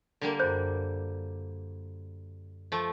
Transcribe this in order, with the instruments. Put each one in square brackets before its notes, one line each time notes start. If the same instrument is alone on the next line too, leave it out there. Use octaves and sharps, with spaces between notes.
[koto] D3 G3 A#3
[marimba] F#2 B5 [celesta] C5 G6
[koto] F3 A3